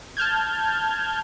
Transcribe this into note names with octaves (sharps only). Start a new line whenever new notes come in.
A5 F6 G6 G#6